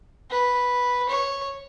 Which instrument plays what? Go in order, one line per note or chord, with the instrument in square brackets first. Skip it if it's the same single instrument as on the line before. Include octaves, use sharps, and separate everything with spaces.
[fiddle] B4
C#5